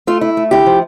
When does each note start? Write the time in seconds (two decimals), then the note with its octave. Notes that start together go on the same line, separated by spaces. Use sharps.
0.07 A3 F4
0.21 E4
0.37 A3
0.51 D3 E4 G4
0.66 F3